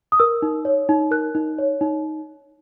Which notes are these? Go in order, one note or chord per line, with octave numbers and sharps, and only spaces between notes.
D#6
A#4 E6
D#4
C#5
D#4
A#4 F#6
D#4
C#5
D#4